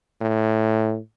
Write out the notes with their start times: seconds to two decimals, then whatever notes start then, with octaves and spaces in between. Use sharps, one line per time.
0.21 A2